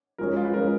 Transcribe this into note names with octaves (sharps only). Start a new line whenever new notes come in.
F3 G#3 C#4 A#4
F4
B4
F3 G#3 C#4 A#4